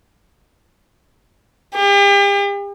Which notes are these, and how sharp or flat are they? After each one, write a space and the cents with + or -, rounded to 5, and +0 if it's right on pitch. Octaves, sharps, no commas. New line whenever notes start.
G4 +40